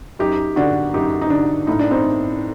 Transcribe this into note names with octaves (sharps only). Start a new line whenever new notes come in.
F#2 D#4 G4
D3 D4 F#4
F#2 D#4 G4
D#4
D3 D4
A2 D#4
D4
C4 D#4